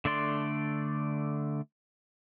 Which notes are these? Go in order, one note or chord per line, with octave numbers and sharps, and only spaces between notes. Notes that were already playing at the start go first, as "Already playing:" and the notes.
D3 A3 D4 D5 C6